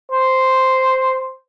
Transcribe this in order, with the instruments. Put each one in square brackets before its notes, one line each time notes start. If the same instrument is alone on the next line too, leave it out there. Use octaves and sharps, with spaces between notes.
[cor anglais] C5